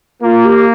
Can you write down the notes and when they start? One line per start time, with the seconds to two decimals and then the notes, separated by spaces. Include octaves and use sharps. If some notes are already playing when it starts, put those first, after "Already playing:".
0.23 A#3 F4
0.45 G4